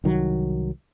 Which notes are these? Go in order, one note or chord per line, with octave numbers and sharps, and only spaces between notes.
C2 D#3 F#3